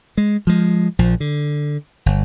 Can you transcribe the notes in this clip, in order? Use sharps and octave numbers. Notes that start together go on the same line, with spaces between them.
G#3
F3 G#3
A#1 F3
D3
G1